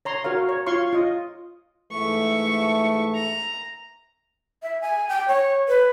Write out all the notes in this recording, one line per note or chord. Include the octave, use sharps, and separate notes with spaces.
C#5 A#5 C6
F#4 A#4 C#5 F5
C#5
F4 C#5 F5 C6 C#6
F4 D#5
G#2 E3 A3 E5 C#6
A#5
E5
G#5
G5
C#5
B4